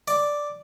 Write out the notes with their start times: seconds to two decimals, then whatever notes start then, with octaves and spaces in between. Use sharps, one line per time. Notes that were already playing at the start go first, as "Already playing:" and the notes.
0.08 D5